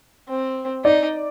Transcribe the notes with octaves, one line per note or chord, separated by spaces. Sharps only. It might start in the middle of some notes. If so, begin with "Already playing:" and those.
C4
D#4 D5